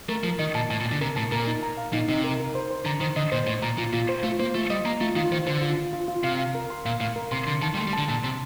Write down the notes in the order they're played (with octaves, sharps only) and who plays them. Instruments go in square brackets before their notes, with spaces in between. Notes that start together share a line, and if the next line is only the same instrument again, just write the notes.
[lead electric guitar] A3 [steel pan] A#4
[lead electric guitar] F3 [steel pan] A#4
[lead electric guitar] D#3 [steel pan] D#5
[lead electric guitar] A#2 [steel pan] A5
[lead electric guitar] A2 [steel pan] A5
[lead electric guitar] A#2
[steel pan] A5
[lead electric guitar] D3
[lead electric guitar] C3 [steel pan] A#4
[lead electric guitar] A2 [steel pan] A5
[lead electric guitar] A#2 [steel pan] A#4
[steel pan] D#4
A#5
F5
[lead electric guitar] A#2 [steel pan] D#4
[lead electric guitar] C3 [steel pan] D#4
[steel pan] A#4
A#4
C5
C5
[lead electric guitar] D3 [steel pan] A#5
[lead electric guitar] D#3 [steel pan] C5
[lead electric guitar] D3 [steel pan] D#5
[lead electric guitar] A#2 [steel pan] C5
[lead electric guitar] A2 [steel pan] C5
[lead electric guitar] A#2 [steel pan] A#5
[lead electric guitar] A#2 [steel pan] F4
[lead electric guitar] A#2 [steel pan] F4
[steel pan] C5
[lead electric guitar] A3 [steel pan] F4
[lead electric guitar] A#3 [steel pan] C5
[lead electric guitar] A3 [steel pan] F4
[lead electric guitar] G3 [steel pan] D#5
[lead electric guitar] A#3 [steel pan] A#5
[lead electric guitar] A3 [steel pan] F4
[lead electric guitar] D#3 [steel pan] F4
[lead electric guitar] D#3 [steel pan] C5
[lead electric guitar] D3 [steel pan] C5
[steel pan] F4
F4
F4
F4
[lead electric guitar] C3 [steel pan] F5
[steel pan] F5
A#4
C6
[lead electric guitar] A#2 [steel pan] F5
[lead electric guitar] A2 [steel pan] F5
[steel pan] A#4
[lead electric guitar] C3 [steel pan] C6
[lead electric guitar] D3 [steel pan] C6
[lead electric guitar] D#3 [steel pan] A5
[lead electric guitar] G3
[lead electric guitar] A3 [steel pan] C6
[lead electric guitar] G3
[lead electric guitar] D3 [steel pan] A5
[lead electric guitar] A#2 [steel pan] A5
[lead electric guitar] C3 [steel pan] C6